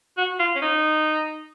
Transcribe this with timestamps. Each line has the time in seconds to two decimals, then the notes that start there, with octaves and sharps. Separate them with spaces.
0.17 F#4
0.39 F4
0.56 C#4
0.62 D#4